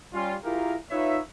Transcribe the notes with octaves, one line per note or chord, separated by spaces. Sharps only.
G3 C#4 F4
E4 F4 G4 G#4 A#4
D#4 F4 B4 C#5 E5